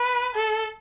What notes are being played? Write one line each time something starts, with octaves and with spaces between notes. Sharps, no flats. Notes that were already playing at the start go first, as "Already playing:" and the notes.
Already playing: B4
A4